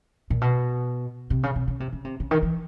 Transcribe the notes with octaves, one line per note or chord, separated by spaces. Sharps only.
A#2
B2
C3
C#3
C3
C#3
C3
C#3
C3
C#3
D#3
E3